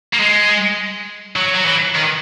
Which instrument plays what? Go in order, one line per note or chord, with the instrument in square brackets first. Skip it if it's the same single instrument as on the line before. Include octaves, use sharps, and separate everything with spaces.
[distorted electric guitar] A#3
G#3
F#3
F#3
E3
D#3